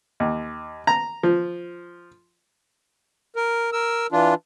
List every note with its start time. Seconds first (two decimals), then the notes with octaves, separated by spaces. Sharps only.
0.20 D#2
0.87 A#5
1.23 F3
3.36 A#4
3.73 A#4 E6
4.12 E3 D4 F4